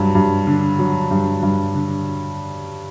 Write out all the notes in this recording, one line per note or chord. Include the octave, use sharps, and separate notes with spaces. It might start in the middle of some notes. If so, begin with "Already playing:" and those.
Already playing: G2 F#3
G2
D3
F#3
G2
G2
D3